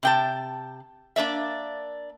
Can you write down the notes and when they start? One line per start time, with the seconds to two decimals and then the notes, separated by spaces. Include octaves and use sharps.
0.03 C3 G5 A5
1.16 A#3 D4 D5 E5